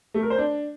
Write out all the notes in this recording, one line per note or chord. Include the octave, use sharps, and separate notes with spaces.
A3
A#4
C5
D4